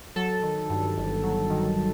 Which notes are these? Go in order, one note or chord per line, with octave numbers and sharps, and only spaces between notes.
F#3 A4
D#3
G2
G1
F#3
D#3